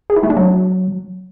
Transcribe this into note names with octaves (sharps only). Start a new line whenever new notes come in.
G#4
E4
A3
D4
F#3